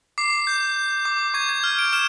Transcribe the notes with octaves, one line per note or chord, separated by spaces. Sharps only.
D6 C7
G6
G6
D6
C#6 G#6
G#6
F6
D7
F6 E7